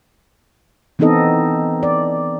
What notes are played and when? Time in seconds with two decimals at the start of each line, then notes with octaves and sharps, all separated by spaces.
0.99 E3 B3 C4 D#4 A4 D#5
1.83 D5